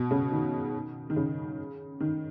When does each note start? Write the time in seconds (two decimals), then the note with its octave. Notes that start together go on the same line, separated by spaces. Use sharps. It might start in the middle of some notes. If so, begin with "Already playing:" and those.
Already playing: B2
0.11 C#3
0.32 D#3
1.10 D#3
1.16 C#3
2.00 D#3